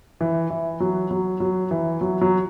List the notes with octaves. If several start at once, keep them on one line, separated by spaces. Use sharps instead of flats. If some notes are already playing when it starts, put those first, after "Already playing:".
E3
E3
F#3
F#3
F#3
E3
F#3
F#3